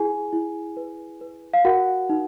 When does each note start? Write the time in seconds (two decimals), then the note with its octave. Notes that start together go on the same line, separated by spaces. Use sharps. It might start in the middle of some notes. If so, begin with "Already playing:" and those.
Already playing: E4 G#4 G#5
0.33 E4
0.77 B4
1.21 B4
1.54 F5
1.65 F#4 A#4 F#5
2.09 D#4